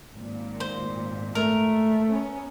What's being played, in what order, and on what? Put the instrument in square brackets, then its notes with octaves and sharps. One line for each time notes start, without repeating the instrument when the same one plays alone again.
[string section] G#1 A#2
[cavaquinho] C5
[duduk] A3 [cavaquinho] A#4
[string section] B3 C#4